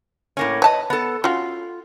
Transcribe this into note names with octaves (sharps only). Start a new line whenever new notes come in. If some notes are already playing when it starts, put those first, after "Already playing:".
A2 A#3 C#4
B4 C#5 D#5 A5
B3 A4
C#4 F4 F#4